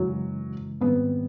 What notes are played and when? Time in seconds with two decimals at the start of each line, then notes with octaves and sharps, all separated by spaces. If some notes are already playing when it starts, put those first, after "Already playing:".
Already playing: F#2 C#3 E3 F#3 G#3
0.81 G#2 D#3 G3 B3 C4